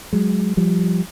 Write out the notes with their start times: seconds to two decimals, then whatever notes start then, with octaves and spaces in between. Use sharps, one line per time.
0.13 F#3 G#3
0.57 F3 G3